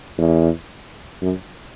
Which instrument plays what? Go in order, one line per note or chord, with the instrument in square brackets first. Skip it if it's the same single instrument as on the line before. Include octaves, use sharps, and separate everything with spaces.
[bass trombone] E2
F#2